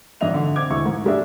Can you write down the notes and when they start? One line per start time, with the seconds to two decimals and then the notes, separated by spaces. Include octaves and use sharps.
0.21 G#1 D4 D#5 E5 F7
0.33 D3
0.56 C4 D6 G#6
0.70 E1 D2 E4 C#6
0.86 G#2
1.05 G3 G#3 D4 E5